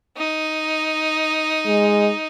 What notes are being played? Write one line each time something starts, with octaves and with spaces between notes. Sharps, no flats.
D#4
G#3